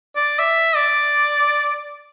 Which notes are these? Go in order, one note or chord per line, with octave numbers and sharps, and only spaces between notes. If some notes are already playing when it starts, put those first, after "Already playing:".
D5
E5
D5